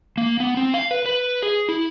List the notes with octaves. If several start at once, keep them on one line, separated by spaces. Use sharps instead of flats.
A#3
B3
C4
F5
B4
B4
G#4
E4